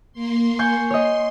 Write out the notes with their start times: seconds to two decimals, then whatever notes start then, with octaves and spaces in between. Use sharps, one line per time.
0.13 A#3 C6
0.59 G#5 C#6 G6
0.90 C#5 D#5 C6